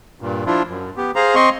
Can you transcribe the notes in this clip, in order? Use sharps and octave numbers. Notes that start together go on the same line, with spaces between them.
G2 A#2
F3 D4 E4 F4
F#2
B3 G4
G#4 C5 F5 A#5
C4 D#5 C6 C#6